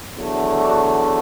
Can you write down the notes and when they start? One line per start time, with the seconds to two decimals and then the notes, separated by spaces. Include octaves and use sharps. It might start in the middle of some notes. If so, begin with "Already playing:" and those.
0.16 E2 D3 F#3 A3
0.61 D4 F#4